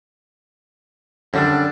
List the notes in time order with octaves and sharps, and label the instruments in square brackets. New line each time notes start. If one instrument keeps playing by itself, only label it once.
[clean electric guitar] F#2 G3 D4 [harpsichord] D3